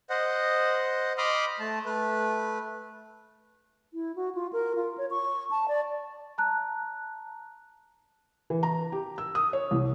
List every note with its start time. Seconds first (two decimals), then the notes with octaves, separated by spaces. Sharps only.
0.10 C5 D#5 F#5
1.18 D#5 B5 C6 D6 D#6 F6
1.59 A3 A5
1.86 A3 B4
3.94 E4
4.16 F#4
4.35 F4
4.53 A#4
4.75 F4
4.98 C#5
5.10 C#6
5.51 A5
5.68 D5
6.38 A5 A#5 F#6
8.50 E3
8.63 A#5
8.92 G4
9.18 E6
9.35 D#6
9.53 C#5
9.71 C2